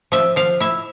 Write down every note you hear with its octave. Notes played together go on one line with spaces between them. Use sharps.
F3 E5
F3 F5
E4 E5